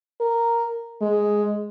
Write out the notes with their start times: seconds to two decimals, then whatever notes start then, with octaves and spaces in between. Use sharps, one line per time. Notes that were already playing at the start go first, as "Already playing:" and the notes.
0.21 A#4
1.01 G#3